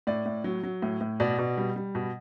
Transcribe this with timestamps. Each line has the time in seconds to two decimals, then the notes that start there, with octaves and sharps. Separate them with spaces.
0.07 A2 D5
0.26 A2
0.44 F#3
0.63 F#3
0.82 A2
1.01 A2
1.20 B2 D5
1.39 B2
1.57 G3
1.76 G3
1.95 B2